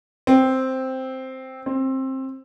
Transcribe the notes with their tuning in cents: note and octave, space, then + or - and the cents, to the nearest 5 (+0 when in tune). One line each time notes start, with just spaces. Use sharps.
C4 +0
C4 +20